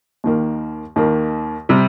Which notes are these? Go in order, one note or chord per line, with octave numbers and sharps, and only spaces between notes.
D#2 D#3 A#3
D#2 D#3 A#3
C3 G3